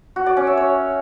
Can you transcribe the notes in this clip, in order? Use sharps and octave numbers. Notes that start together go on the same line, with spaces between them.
F#4
D5
C#4
E5
C#5